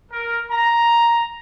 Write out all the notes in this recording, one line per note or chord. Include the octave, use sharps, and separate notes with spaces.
A#4
A#5